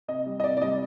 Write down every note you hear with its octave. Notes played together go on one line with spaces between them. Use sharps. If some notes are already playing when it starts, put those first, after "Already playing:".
C3 D#5
G3
D#5
C3 D5
D5
G3 D#5